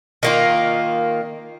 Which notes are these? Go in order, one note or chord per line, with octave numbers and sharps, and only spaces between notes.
D#3 A#3 F4